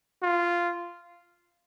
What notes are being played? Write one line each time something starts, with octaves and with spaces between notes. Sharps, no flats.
F4